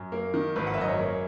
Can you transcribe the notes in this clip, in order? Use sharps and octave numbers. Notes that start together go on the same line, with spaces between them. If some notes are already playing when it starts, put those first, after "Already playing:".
Already playing: F#2
A#3
D#3
G#1 B4
F#5
E5
F#2 D#5
C#5
A#3